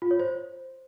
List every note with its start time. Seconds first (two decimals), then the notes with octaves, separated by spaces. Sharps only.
0.02 F4
0.11 C#5
0.20 C5